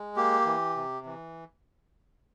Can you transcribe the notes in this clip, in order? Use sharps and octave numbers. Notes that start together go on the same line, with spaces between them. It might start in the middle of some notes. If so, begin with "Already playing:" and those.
Already playing: G#3
A#3 G4
E3
C3
E3